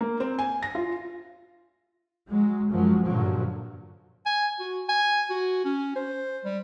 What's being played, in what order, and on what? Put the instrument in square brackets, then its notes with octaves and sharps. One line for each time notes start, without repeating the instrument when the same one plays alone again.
[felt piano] A#3
C4
G#5
A#6
F4
[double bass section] F#3 G#3
F#2 F3 F#3 G#3
G2 A#2 D3 F3 F#3
[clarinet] G#5
F#4
G#5
F#4
C#4
C5
G3